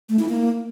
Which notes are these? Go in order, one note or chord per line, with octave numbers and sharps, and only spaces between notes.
A3
E4
A#3